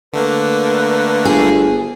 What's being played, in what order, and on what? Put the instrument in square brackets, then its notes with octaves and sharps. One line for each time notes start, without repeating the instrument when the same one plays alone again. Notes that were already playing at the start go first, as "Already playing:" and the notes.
[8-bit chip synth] D3 A3 A#3 [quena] B4
[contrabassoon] G1 [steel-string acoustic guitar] G#4